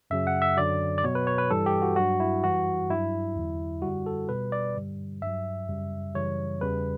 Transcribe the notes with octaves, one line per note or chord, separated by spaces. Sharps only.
F#2 C#3 F#3 E5
F#5
E5
F#2 D3 F#3 D5
D5
B2 F#3 C#5
B4
C#5
B4
G2 E3 G3 A4
G4
F#4
G2 F#3 F#4
E4
F#2 E3 G3 F#4
G2 F#3 E4
E2 D3 F#3
F#2 D3 G3 F#4
A4
B2 G3 B4
D5
G2 D3 G3
G2 F#3 E5
F#2 C#3 G3
F#2 C#3 E3 G3 C#5
E2 C#3 G3 B4